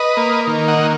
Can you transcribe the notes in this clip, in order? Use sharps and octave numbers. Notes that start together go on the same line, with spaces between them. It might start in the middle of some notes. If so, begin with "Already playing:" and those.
Already playing: B4 D#5
A#3
D#3
D#5 F#5
D#3